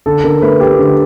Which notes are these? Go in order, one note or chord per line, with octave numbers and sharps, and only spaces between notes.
D3 A4
D3 A#4
A3 B4
A3 G4
D3